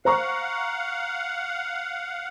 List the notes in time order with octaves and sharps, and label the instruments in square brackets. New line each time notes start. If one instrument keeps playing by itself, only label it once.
[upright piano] C5 A#5 C#6 [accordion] F5 F#5